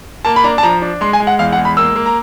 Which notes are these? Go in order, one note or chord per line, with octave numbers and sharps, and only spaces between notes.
A#3 A5
B5
D4 A#5
A5
F3 A#5
D4
G#3 C6
G#5
G#3
F#5
E2 F5
F#5
G#3
B5
A#3 E6
A#3
A#5